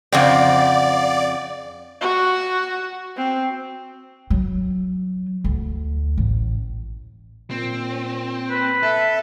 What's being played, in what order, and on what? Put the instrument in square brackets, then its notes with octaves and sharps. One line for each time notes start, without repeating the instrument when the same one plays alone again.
[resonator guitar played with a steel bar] F2 C#3 C4 [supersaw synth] D5 [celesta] F5 F#5
[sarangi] F#4
C4
[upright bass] F#3
D2
A1
[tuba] A#2 [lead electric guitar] C4
[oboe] B4
[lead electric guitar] A4 [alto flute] E5